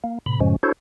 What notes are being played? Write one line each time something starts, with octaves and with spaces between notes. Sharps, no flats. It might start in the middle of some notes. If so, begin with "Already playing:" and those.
A#3
A2 C3 B5
F#2 A2 C#3 F3 G#3 C#4
D4 E4 F#4 A4 C5 C#5